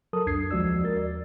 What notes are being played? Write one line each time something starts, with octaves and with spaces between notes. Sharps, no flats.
F#3 A4 A#4 A5 D#6
C2 F2 D4 G#6 C7
D#2 F3 G#3 F#4 D5 E6
A#4 A6
D5